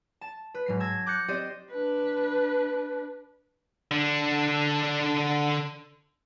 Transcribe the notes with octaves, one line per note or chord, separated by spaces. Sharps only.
A5
B4
G#2 F#3 C7
A5 E6 G#6 A#6
D6 F#6 G6 A#6 C#7
C4 G4 C5 D5 D#5
D4 B4
D3 D4